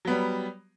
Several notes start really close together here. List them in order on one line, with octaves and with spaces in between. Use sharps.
F#3 B3 G3